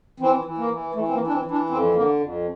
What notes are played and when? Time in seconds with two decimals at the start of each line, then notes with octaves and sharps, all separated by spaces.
0.20 E3 C4
0.45 E3
0.58 A#3
0.71 E3
0.94 E3 A3
1.08 C4
1.13 A#3
1.20 E3
1.27 D4
1.33 C4
1.45 E3
1.51 D4
1.70 F2 C4
1.95 D3 A#3
2.20 F2